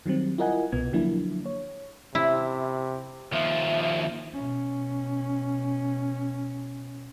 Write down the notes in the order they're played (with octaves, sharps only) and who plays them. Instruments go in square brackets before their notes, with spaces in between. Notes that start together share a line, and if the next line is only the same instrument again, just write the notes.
[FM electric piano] D#3 F#3 G3 C4
E4 F4 A#4 D#5 F#5 G#5
C2 B2 B3 G#6
D3 F3 F#3 A#3 D4 E4
C#5
[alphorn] C3 [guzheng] E4
[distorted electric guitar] D#2 F3 [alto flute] E5
[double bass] B2 C#4